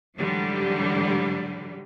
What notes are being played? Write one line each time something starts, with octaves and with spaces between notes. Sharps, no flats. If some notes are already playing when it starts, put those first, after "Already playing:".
G#2 D3 E3 F#3 G3